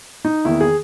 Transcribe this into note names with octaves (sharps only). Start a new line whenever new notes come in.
D#4
E2 D#3 A#3 E4
G#4